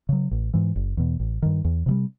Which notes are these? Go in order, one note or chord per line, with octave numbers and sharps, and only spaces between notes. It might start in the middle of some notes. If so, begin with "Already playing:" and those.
C#3 F#3
A1
G#2 E3
F#1
E2 B2
A1
G2 D#3
E2
C3 E3 G3